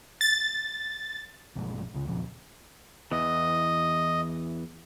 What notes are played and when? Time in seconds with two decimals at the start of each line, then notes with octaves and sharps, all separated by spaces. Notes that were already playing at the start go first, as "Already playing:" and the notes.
0.21 A6
1.55 A#1 G2 B2 G#3
1.94 C#2 C#3
2.09 B1 E2 A#2 F3
3.11 E2 E3 D#5